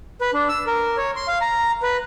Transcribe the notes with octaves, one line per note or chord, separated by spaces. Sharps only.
B4
D4
E6
A#4
C#5
C6
F5
A#5
B4